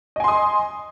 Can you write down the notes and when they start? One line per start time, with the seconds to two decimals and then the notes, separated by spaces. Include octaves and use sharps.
0.16 D#5
0.20 G#5
0.24 C6
0.28 D#6